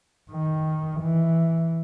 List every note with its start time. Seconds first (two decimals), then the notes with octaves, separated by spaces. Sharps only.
0.31 D#3
1.00 E3